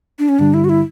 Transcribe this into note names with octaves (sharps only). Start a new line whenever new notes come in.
D4
C#4
G2 D3 G3 D4
E4
F#4
E4